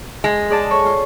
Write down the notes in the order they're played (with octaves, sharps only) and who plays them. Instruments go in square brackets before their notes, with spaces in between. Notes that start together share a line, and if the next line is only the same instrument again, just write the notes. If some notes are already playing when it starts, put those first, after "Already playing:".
[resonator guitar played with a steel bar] G#3
[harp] G#4 D5 A5
A4 C#5 C#6
F4